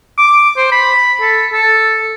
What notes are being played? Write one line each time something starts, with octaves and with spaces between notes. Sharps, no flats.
D6
C5
B5
A4
A4